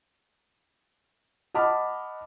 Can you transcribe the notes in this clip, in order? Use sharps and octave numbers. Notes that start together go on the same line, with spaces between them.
D#5 F#5 A5 B5 D6 F6